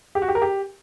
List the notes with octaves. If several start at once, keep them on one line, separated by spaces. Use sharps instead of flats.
G4
F#4
G4
A#4
G4